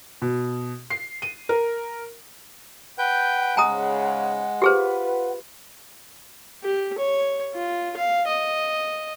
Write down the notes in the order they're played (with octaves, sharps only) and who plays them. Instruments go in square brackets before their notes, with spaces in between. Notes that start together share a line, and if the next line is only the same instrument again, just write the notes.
[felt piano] B2
C7
D#7
A#4
[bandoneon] B4 G5 G6 [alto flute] F#5
[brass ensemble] G#2 C#3 [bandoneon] G#3 [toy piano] G#5 A#5 D#6
[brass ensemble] F4 B4 [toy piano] G4 G#4 C5
[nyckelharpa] G4
C#5
F4
F5
D#5